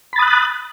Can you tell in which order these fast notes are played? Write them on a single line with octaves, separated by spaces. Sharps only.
B5 A6 D#6 F#6